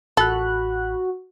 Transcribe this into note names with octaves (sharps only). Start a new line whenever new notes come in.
A1 F#4 A4 B5 F#6